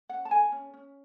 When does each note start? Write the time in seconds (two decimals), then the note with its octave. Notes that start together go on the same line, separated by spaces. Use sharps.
0.09 C#4 F#5
0.25 A5
0.31 A4 G#5
0.52 C#4
0.74 C#4